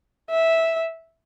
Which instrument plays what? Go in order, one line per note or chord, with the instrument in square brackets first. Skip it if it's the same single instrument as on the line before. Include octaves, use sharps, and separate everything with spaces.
[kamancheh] E5